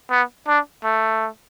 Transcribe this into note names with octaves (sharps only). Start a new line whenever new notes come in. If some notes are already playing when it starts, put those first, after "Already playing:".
B3
D4
A3